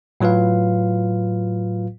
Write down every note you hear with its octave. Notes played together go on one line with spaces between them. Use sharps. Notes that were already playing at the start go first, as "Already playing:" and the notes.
A2 F#3 F4 B4 F5